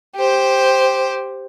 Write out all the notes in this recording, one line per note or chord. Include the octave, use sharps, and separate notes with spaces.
G4 C5